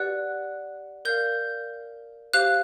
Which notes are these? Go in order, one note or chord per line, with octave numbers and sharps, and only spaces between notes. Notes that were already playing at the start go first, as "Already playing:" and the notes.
Already playing: G4 B4 D5 F#5 F#6
A#4 D5 F5 G6
G4 C5 F5 F#6